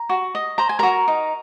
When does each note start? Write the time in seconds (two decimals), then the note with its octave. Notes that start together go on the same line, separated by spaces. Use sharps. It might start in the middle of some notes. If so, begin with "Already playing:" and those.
Already playing: A#5
0.09 F#4
0.35 D#5
0.58 C5 A#5
0.69 G#5
0.79 F#4 A#4 A#5
1.08 D#4